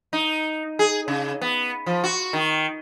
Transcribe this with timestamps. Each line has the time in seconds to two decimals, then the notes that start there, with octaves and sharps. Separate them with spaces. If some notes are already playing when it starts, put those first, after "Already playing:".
0.13 D#4
0.79 G#4
1.08 C#3
1.41 B3
1.86 F3
2.04 F#4
2.33 D#3